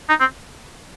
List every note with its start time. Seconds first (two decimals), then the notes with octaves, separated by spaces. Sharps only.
0.09 D#4
0.20 C4